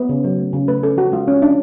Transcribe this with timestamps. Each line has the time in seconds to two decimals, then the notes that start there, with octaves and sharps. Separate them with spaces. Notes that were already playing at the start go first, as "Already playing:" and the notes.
Already playing: B3
0.09 C#3
0.24 F#3
0.39 A3
0.53 C#3
0.68 A3 B4
0.83 C#4 A4
0.97 F3 F#4
1.12 G#3 F4
1.28 C#4
1.42 F3 D4